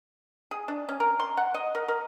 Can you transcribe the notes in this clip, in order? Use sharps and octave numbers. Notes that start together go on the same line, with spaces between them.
G#4
D4
C#4
A#4
C6
F#5
D#5
A#4
A#4